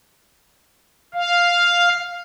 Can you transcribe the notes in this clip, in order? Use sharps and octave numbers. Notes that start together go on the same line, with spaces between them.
F5